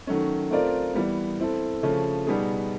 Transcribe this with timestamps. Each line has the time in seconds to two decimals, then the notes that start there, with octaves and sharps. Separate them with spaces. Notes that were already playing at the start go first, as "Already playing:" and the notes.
0.07 D#3 F#3 A3 C#4
0.50 A3 C4 F4 A#4 D5
0.94 E3 G3 B3
1.40 C4 E4 A4
1.83 C#3 F3 A3 C#4
2.27 B2 G3 B3 D#4 G#4